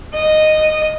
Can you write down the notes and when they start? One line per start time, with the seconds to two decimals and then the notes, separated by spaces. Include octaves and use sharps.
0.15 D#5